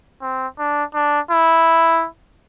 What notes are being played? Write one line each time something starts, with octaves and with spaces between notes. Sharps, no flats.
C4
D4
D4
E4